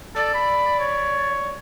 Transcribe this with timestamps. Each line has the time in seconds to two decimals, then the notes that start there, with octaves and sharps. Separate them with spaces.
0.15 A4 D5
0.35 B5
0.80 C#5